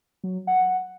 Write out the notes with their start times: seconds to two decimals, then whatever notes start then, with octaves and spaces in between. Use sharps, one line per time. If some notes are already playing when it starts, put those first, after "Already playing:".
0.24 F#3
0.47 F#5